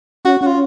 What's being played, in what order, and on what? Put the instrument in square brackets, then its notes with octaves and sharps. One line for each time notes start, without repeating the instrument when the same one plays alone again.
[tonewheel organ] C#4 [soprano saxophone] F#4
[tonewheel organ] C#4 [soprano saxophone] F#4
[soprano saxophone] F4